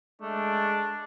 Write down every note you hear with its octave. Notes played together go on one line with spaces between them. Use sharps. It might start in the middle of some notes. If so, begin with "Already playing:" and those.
G#3 A3 D4